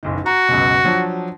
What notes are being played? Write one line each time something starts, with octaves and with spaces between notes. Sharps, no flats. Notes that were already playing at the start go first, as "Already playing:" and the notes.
F#1 B1 D#3
F#4 A#5
C#2 F#2 B2
F3 F#3 D4